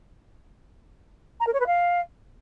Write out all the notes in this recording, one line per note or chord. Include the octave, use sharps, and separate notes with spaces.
A#5
A#4
C#5
B4
F5